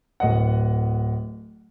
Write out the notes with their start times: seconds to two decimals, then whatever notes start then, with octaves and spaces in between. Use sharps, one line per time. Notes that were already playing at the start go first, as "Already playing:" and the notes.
0.20 D1 D#5 F#5